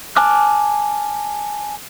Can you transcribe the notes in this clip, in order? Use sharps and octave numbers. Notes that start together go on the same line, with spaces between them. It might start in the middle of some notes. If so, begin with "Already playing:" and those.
G#5 A5 D6 F6 F#6